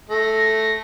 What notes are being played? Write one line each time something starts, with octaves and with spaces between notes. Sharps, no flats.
A3 A#6